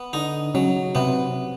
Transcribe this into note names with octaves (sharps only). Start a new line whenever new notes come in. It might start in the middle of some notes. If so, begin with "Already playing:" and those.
Already playing: B3
D3 D#4
C#3 F#3
C3 B3